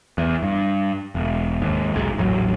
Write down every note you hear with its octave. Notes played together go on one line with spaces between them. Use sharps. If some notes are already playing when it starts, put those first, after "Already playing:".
E2
G2
E1
D#2 G#2
F1 B1 G#2
D#1 A1 A2 F#3